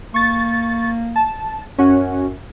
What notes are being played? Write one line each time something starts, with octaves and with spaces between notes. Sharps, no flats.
A#3 C#6 A6
A5
F#2 C#4 F#4